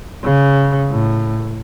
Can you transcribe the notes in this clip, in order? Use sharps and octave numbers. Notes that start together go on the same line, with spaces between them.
C#3
A2